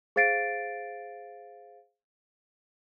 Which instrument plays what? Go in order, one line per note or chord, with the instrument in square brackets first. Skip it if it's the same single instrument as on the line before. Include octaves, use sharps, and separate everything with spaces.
[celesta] G#4 C5 F5 A6 C7 D7